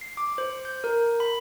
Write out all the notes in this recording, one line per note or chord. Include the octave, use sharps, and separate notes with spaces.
C7
D6
C5
G6
A#4
B5